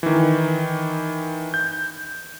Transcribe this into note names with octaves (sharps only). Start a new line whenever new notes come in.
D#3 E3
G6